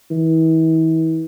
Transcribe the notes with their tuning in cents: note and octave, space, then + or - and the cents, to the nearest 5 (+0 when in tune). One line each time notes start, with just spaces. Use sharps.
E3 -40